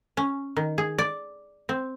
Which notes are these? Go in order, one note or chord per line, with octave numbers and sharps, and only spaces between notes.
C#4
D#3
G#4
D5
C4